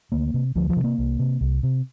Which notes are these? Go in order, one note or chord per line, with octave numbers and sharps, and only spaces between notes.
D2 A#3
C3
D2 F3
F3
C3
A#3
C2
C3
C2
C3